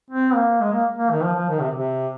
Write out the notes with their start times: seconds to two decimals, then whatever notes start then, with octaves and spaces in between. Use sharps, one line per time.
0.10 C4
0.35 A#3
0.61 G#3
0.73 A#3
0.98 A#3
1.11 D#3
1.24 F3
1.36 F3
1.49 D#3
1.61 C3
1.76 C3